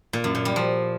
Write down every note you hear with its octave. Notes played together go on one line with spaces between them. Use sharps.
A#2
F#2
A#2
G3
F3